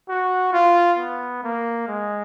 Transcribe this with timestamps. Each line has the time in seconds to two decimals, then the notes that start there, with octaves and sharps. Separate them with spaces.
0.09 F#4
0.53 F4
0.99 B3
1.43 A#3
1.88 G#3